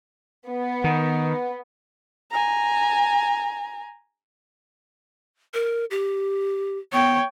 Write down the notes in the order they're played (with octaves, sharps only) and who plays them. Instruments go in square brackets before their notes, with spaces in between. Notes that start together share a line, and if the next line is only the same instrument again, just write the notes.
[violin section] B3
[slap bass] D#3
[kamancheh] G#5 A#5
[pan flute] A#4
G4
[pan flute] B3 [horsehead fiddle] C#5 G5